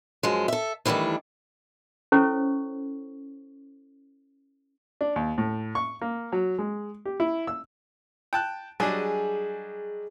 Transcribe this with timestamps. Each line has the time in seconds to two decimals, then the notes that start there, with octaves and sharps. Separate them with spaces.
0.23 F#2 F3 G#3
0.48 A4 E5
0.85 D#3 E3 G3 A3 D4
2.12 C#4 E4 A4 C5 C#5 C#6
5.01 D4
5.16 D#2
5.38 A2
5.75 C#6
6.01 A#3
6.32 F#3
6.59 G#3
7.05 G4
7.20 E4
7.47 E6
8.33 G5 A5 F#6
8.80 F#3 G3 D4 G#4 D#5